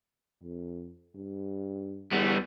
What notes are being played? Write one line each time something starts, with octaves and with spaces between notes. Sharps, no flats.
F2
G2
E2 G3 B3